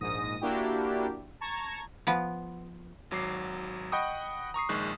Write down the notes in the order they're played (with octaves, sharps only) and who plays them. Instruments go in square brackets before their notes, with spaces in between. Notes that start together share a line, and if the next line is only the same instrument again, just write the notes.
[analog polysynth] A#1 G#2 D#6 A#6
A#3 D4 E4 F#4 G4
A5 A#5 C#6 G#6
[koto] F3 B3
[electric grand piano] G#1 F#3 D6 C7
D#5 F#5 G5 B5 C#6 D#6
A#5 C#6 D#6 C7
A#1 D#3 G#3 C#6 F#6